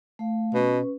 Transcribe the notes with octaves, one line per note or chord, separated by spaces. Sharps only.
A3 F5
B2 C#4 B4